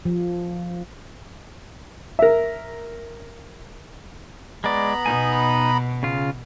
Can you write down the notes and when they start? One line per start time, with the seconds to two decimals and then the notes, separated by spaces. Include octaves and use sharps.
0.05 F3
2.19 A#4 E5
4.64 G#3 B3 D5 A#5 B5
5.06 B2 D#4 G#5
6.03 C#3 F4